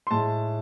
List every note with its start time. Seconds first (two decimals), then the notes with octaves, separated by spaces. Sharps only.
0.07 C6
0.11 A2 G#3 A5